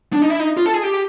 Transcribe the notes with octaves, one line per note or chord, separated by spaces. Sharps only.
D4
D#4
E4
D#4
F4
A4
G#4
G4